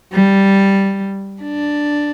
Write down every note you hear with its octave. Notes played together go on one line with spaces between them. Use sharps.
G3
D4